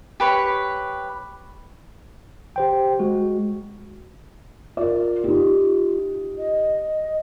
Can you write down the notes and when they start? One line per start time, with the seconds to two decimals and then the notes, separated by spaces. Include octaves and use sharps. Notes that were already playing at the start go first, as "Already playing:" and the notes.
0.20 G4 B4 C#5
2.56 G4 C5 G5
2.99 G#3 F#4
4.77 F4 A#4 D5
5.24 D#4 G4
6.38 D#5